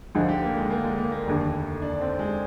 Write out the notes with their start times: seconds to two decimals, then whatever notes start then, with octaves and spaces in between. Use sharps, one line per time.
0.15 D2 D3 F3 D#4
0.29 G4
0.42 A#3
0.57 G#3
0.70 A#3
0.84 G#3
0.98 A#3
1.12 A#3
1.26 F1 D#2 D3
1.82 D4
2.01 C4
2.19 G#3